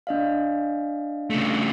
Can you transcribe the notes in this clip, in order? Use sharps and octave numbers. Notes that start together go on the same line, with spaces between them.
D4 D#5 F5
C#3 A3